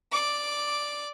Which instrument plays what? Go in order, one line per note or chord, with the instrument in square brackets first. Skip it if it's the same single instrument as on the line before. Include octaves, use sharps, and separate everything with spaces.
[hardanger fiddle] D5 D6